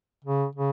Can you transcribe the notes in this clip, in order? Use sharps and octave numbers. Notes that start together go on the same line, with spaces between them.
C#3
C#3